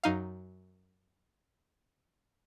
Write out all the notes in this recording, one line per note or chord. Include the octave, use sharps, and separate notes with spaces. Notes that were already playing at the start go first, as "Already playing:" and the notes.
F#2 D#4 F5